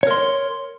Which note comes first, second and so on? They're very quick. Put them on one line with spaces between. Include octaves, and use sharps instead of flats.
C#5 A#4 C6